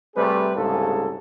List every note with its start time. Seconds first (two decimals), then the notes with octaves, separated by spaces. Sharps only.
0.15 C3 G3 A3 C4 G#4 B4
0.55 C2 G#2 C#3 A#3 G#4 A4